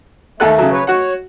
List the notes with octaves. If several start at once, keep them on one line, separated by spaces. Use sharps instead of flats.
D#2 A3 A4 F#6
C#3 F#3
B4 C#5
F#4 C#5 F#5